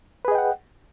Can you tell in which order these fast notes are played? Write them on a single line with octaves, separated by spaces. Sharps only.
B4 G#4 D#5 G5 F#5